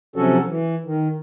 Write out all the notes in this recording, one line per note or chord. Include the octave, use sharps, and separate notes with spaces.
C3 F3 F#3 C#4 F#4 A4
E3
D#3